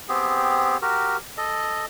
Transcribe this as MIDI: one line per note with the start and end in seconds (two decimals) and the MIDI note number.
0.09 0.77 59
0.09 0.77 60
0.09 0.77 67
0.09 0.77 68
0.82 1.17 66
0.82 1.17 67
0.82 1.17 70
1.37 1.86 69
1.37 1.86 75